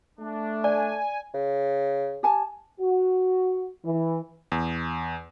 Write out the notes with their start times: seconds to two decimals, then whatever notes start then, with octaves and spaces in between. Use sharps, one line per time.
0.19 A3 D4
0.64 D5 G#5
1.34 C#3
2.23 G4 G#5 A5
2.80 F#4
3.85 E3
4.52 E2